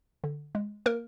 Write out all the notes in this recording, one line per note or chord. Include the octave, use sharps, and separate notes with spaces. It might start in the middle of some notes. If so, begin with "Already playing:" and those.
D3
G#3
A#3 A#4